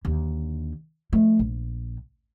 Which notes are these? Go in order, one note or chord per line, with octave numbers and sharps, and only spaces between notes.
D#2 D3
F3 A3
A#1